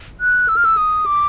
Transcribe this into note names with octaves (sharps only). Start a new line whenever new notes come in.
F#6
E6
F6
E6
D#6
D6